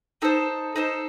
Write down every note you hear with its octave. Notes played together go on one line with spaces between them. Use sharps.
D#4 A4 C5
D#4 A4 C5